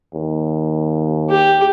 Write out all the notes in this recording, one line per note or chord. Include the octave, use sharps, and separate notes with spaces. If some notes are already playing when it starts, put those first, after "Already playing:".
D#2
G4